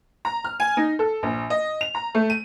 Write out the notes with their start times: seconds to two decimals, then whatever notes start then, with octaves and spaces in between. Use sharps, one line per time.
0.25 A#5
0.44 F6
0.60 G#5
0.77 D#4
0.99 A4
1.23 A#1
1.50 D#5
1.81 F7
1.95 A#5
2.15 A3
2.30 D#7